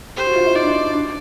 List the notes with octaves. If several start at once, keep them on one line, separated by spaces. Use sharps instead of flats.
G4 C5
F#4
F4
E4
D#4 D5
D4
D#4
D4